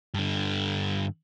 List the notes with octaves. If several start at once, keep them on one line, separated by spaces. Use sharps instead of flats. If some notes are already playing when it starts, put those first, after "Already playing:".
G2 D3